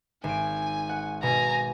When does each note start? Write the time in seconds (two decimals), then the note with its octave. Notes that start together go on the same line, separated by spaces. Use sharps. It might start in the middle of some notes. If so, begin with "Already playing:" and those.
0.24 G#1 G#5 D7
0.89 F#5
1.23 B2 G#5 A#5